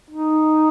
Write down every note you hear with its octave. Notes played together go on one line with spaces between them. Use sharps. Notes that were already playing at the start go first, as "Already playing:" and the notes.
D#4